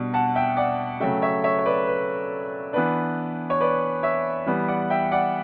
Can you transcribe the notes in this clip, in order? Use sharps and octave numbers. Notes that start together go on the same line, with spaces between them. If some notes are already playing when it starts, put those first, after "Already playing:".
Already playing: B2 G3 D4
F#5 A5
E5 G5
D5 F#5
C#3 F#3 A3 E5 G5
C#5 E5
C#5 E5
C#5
B4 D5
B4
E3 B3 D4 B4
C#5
B4 D5
C#5 E5
E3 G3 B3
D5 F#5
E5 G5
D5 F#5